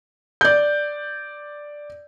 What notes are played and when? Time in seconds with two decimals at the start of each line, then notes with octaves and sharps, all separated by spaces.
0.41 D5 G6